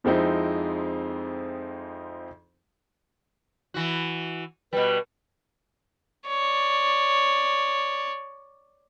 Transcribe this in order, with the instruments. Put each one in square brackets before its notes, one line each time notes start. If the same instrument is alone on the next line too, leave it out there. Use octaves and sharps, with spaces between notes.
[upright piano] F2 F3 G#3 C4 D#4 E4
[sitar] E3 F#4
[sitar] B2 G3 [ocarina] B4
[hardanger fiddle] C#5 D5